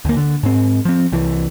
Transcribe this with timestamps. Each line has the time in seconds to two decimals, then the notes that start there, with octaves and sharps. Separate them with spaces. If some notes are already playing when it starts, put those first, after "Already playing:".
0.05 D2 A#3
0.17 D3
0.43 G#2 C4
0.85 F3 C4
1.12 C2 E3